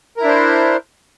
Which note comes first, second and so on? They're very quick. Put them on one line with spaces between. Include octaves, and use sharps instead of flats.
A#4 E4 D4 C5